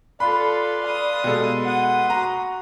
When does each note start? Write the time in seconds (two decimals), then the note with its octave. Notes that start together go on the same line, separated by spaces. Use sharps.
0.20 F4 A4 B4 D5 B5 C6
0.82 F5 D#6
1.24 B2 G3 G#3 A4
1.66 F#5 D#6
2.10 F#4 A#5